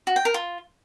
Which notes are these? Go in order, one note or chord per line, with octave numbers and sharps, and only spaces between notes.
F#4
G5
A#4
F4